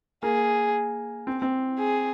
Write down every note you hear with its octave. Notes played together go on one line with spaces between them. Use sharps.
A#3 G#4
C4
C4
G#4